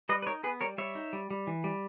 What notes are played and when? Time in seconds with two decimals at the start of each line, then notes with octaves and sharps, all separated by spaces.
0.09 G3 B4 D#5
0.22 B4
0.26 D#4 A#4 C#5
0.43 B3 G#4 B4
0.61 G3 A#4 C#5
0.78 G3 C#5 E5
0.95 D#4
1.13 G3
1.31 G3
1.47 E3
1.64 G3